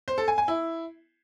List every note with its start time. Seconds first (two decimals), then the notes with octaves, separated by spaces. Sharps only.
0.08 C5
0.18 A4
0.28 G#5
0.38 G#5
0.48 E4